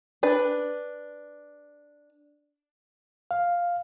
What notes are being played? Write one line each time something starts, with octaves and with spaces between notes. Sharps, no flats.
D4 B4
F5